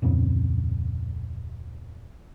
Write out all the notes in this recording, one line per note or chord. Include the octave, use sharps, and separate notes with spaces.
D1 F2 A#2 C#3